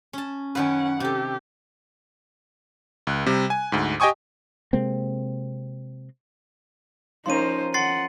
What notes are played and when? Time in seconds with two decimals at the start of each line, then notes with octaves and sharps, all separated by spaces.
0.13 C#4 A5
0.55 F#2 D#3 C#4 B4 F#5
1.00 C3 G4 A4
3.07 C#2 F#6
3.26 C3 G3
3.50 G#5
3.72 D2 G#2
4.00 G4 D#5 G5 G#5 C#6 D#6
4.73 C3 G#3 A#3 C4
7.26 F3 C#4 D#4 A#4 C5 C6 D#7
7.74 F#5 C6 A6 C7